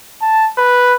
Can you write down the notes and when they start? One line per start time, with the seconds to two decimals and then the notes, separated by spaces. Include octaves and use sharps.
0.22 A5
0.58 B4